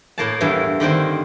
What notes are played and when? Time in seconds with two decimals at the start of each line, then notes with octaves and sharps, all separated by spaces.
0.18 A2 A#3 A5
0.41 E2 G2 E3
0.80 D3 D#3 A#3 C4